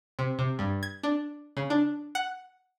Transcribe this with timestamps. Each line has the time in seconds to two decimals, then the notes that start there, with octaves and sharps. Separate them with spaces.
0.19 C3
0.39 C3
0.59 G2
0.83 G#6
1.03 D4
1.57 C#3
1.70 D4
2.15 F#5